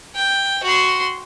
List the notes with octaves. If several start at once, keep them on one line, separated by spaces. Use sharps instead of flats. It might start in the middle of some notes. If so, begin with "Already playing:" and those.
G5
F#4 C6